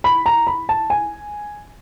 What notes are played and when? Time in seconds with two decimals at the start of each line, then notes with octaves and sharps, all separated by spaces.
0.04 B5
0.26 A#5
0.47 B5
0.69 A5
0.90 G#5